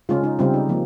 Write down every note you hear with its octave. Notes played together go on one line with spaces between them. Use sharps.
C#3 G#3 C#4 F4
D#4
C#3 G3 C4 F4
D#4
F3 A#3